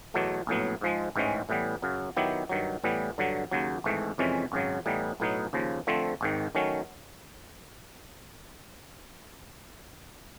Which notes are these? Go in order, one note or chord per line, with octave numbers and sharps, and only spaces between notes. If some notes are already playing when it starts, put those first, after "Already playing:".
E2 B2 F#3 A3
A#1 A2 F#3 B3
G#2 F3 G#3
A1 G#2 E3 G#3 C#4
A2 E3 G3 B3
F#2 C#3 F#3
D#3 F#3 B3 E4 G4
G2 D#3 F#3
A2 E3 G3 B3
G2 D3 F#3
D#2 C#3 F#3
G#1 G#2 E3 A3
F2 C3 E3 G#3 C#4
G#1 F#2 C#3 F#3
A2 E3 G3 B3 D#4
B1 A2 F#3 B3 D#4
D#2 C#3 F3
D3 F3 A3 C4
G#1 G#2 D#3
D#3 F#3 A3 C#4